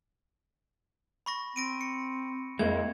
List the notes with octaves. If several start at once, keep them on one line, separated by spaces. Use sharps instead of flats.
B5 C#6 A#6
C4 A#6 D7 D#7
C#7
F2 G#3 A#3 E4 G#6